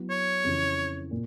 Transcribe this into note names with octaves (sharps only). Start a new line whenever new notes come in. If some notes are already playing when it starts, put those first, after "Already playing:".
Already playing: F#3 B3 E4
C#5
F2 C#3 E3
A#2